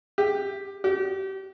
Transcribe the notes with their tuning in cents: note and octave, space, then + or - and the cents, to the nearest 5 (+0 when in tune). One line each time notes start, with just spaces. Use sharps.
G4 +10
G4 -30